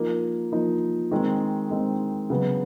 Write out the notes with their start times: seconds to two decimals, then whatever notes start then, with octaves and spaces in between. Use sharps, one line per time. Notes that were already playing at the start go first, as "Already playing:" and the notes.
Already playing: F3 A#3 D#4
0.52 F3 A#3 D#4
1.11 D#3 G#3 C4
1.71 D#3 G#3 C4
2.30 C#3 F#3 B3